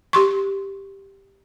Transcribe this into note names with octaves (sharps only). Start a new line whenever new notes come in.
G4 C6 C#6